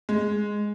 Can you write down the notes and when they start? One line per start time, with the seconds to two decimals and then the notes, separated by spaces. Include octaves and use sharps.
0.09 G#3